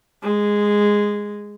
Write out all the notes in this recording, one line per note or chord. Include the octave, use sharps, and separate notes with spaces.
G#3